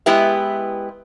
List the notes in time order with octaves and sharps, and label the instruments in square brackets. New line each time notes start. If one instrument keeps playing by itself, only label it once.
[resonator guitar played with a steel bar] G#3 B3 E4 G4 B4 E5